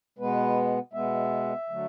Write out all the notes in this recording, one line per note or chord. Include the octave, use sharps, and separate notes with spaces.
B2 G#3 B3 B4
B2 G#3 B3 E5
D3 F#3 A3